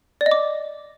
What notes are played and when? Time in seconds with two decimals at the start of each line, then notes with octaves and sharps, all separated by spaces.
0.21 D5
0.26 D#5
0.31 D6